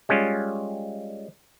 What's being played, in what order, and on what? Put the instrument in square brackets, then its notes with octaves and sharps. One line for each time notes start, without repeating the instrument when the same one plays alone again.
[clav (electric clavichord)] G3 G#3 C#4 F4